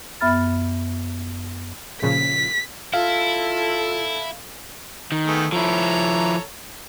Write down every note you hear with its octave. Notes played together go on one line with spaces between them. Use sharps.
F#2 B3 E5 B5 F6 A6
A#2 C#3 F3 B6
E4 F4 A4 F5
D#3
A3 B3 G#4
F3 E4 A4 C#5 A#5